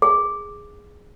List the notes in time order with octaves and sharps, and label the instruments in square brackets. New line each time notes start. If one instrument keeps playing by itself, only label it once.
[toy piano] G#4